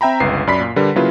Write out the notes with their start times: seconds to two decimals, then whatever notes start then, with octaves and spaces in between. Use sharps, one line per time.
0.01 C4 E5 G5 A#5 B5
0.20 G1 C#2 B4 C7
0.47 F#2 D5 B5 B6
0.60 A#2
0.76 D3 G3 A#4 B4
0.96 C#3 F#3 A#3 E4 F4 B4